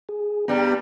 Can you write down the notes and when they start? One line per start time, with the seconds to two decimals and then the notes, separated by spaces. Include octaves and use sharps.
0.09 G#4
0.48 G2 G3 B3 G5 A#5